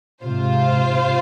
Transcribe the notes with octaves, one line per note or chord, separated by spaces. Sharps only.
G#2 C3 F4 C5 F5